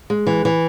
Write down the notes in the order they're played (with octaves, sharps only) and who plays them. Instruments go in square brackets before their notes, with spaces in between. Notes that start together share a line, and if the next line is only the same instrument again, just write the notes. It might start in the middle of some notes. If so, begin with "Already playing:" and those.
[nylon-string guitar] G#3
E3
E3